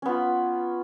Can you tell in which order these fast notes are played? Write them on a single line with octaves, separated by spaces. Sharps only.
C#4 B3 F4